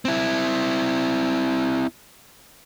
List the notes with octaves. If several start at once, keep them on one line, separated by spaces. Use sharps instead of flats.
C4 E4